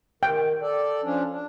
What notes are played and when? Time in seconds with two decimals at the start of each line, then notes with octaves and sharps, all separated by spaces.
0.23 D#3 G5
0.62 A4 D5
1.04 F3 C#4 D4
1.31 D4